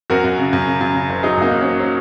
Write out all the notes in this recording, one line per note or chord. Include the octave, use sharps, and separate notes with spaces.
F#2 F#4 A#4
F#2
C#3
F#2
C#3
F#2
C#3
F#1
F#3 D#4 G#4
F#2 A#3 D#4
F#2
F#3 C#4
F#3